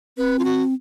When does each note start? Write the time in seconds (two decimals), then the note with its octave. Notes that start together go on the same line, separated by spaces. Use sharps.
0.17 C4 B4
0.39 F4
0.44 F#4